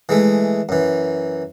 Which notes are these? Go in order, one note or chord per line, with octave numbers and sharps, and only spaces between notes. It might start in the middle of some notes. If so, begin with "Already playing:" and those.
E3 G#3 A3
F#2 E3